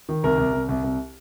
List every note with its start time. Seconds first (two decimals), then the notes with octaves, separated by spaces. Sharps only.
0.09 D#3
0.23 C2 A#4
0.38 C2
0.53 C2
0.69 C2
0.84 C2